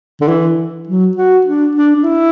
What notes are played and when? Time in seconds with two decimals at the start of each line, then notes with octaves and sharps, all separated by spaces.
0.21 D3
0.28 E3
0.88 F#3
1.17 F#4
1.46 D4
1.75 D4
1.96 D4
2.04 E4